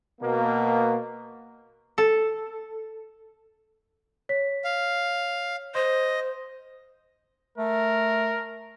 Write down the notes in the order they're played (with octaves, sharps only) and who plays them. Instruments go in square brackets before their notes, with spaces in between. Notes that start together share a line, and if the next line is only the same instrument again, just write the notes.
[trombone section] B2 A#3
[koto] A4
[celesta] C#5 B6
[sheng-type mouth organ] F5
[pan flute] C5 [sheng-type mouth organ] D#5 [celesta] C6
[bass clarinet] A3 [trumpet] A#4